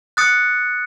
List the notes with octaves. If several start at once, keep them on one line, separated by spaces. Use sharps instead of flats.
D#6 F#6 A6 C#7